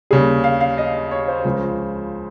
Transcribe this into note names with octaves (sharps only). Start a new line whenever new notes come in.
D#2 C#3 G3 G#4
F5
F5
D#5
C#5
C5
C#2 C#3 F3